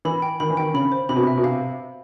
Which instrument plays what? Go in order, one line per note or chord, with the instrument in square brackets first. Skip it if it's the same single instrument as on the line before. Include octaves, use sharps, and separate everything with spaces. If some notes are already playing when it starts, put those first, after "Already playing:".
[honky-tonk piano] E3 [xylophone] B5
[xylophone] G5
[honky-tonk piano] D#3 [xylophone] B5
[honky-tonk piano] E3
[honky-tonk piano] D#3 [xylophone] G5
[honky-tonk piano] C#3 [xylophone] B5
[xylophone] C5
[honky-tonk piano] C3 [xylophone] B5
[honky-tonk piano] B2
C3
[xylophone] E5
[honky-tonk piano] B2
[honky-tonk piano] C3 [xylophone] F5